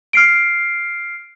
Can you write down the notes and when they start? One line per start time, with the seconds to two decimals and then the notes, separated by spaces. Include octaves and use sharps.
0.13 F6 C7 D7